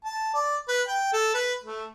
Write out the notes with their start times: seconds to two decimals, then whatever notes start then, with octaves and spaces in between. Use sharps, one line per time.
0.05 A5
0.34 D5
0.68 B4
0.88 G5
1.13 A4
1.34 B4
1.64 A3